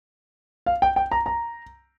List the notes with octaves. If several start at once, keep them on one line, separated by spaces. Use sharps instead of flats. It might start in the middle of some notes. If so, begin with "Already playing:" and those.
F5
G5
G5
A#5
A#5